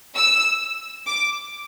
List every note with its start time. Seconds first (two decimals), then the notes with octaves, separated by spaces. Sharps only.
0.16 E6
1.06 D6